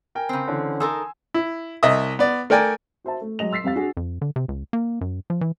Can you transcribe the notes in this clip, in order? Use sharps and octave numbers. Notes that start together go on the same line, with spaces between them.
A#4 G5 G#5
C#3 C4
D3 E3 C#4
D#4 A4 A#4 G#5 C6 E6
E4
C2 D#5 E5 D#6
B3 D5
A3 A#4 D5 G5 G#5
F#4 C5 E5 A5
A3
F#3 G#3 D#5 F7
C6 E6 A6 B6 C7
F2 G3 C4 F5 A6
D4 F#4 G#4
F2
D3
C3
C#2
A#3
F#2
F3
E3